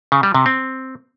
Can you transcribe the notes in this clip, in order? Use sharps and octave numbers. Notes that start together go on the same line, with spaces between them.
C#3
G3
C3
C4